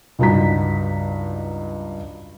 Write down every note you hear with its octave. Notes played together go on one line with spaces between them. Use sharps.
C#2 G2 D#4 F#4 A#5 B6